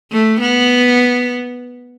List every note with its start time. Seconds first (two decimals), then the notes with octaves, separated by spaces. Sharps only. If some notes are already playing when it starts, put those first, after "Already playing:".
0.12 A3
0.41 B3